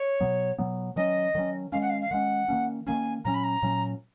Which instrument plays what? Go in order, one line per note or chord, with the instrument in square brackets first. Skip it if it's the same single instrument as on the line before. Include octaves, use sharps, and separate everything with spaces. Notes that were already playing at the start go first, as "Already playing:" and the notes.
Already playing: [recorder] C#5
[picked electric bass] B2 F#3 B3
B2 F#3 B3
[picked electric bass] D#3 F#3 C#4 [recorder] D#5
[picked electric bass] D#3 F#3 C#4
[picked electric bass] D#3 G#3 C#4 [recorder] F5
[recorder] F#5
F5
F5
[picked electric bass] D#3 G#3 C#4 [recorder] F#5
[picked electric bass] D#3 A#3 C#4
[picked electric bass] D#3 A#3 C#4 [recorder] G#5
[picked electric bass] A#2 F#3 C#4 [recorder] A#5
[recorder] B5
A#5
[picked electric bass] A#2 F#3 C#4